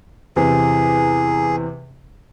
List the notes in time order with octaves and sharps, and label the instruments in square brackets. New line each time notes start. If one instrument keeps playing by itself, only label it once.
[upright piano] E2 C3 E3 [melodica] G#4